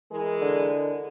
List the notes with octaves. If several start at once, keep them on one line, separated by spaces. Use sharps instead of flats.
E3 G#3 A#4
D3